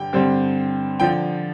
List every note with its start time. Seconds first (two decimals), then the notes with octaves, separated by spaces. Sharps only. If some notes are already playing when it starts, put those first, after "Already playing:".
Already playing: G2 D3 G3 G5
0.13 G2 D3 G3 C4
1.00 D3 F3 G5